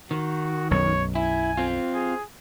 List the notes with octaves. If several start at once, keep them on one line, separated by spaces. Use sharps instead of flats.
D#3 F#4
B1 F#2 C#5
E4 G#5
C4 F4
G#4